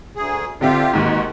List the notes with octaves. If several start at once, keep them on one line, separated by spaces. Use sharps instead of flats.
D2 G#4
D3 C4 F4 G4 E5
D#2 G#2 B2 F#4